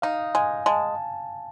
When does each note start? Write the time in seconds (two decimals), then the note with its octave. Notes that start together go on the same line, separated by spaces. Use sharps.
0.02 D#4 F5
0.35 G#3 G#5
0.66 G#3 A5